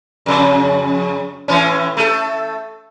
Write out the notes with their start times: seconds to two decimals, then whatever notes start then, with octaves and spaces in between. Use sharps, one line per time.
0.26 F2 C#3
1.48 A2 E3 C#4
1.97 A3 A4